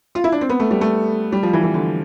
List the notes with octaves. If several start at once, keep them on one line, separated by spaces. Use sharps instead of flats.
F4
E4
D4
C4
B3
A3
G3
A3
G3
F3
E3
E3
D3